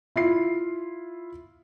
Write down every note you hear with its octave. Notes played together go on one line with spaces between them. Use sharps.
E4 F4 C7